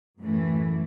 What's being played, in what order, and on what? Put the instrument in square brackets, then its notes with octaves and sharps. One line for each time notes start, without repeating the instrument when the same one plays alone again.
[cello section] F#2 A2 E3 A3